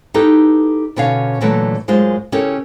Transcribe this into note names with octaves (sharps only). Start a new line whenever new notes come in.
D#4 E4 G4 A4 B4
B2 D3 C#4 C#5 F5
A#2 D3 E3 F#3 A3 A#3
F#2 G#3 F4 C5
C#3 C#4 E4 G4 A4 A#4